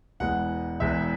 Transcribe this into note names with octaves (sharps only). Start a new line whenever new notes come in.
E1 E2 E3 G#3 F#5
E1 E2 E3 G#3 E5